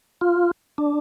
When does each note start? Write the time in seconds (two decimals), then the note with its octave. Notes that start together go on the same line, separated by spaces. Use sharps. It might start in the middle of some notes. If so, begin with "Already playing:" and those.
0.21 F4
0.78 D4